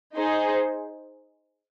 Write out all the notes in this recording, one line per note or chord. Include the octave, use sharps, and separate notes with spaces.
D#4 G#4 C5